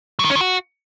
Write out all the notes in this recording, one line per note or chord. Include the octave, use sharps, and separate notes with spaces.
F#3
D#3
C#4
D#3
F#4